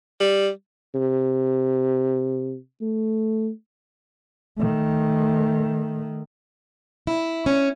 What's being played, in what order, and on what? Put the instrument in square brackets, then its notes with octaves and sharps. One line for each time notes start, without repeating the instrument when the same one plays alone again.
[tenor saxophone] G3
[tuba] C3
A3
[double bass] D#3 A3
[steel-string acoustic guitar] E4
C#4